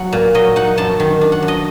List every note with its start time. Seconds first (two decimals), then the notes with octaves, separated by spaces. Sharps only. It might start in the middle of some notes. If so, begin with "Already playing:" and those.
Already playing: F#3 F#5
0.13 A#2
0.34 F#3 D#5
0.56 D#4 F#5
0.78 F#2 A5
1.00 D#3
1.21 D4
1.32 F#5
1.42 F#2
1.48 D#5